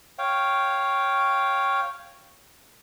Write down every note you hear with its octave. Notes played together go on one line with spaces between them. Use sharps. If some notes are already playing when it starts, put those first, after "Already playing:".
C#5 F5 G5